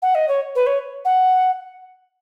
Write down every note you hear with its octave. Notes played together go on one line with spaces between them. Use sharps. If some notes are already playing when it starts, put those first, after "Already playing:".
F#5
D#5
C#5
B4
C#5
F#5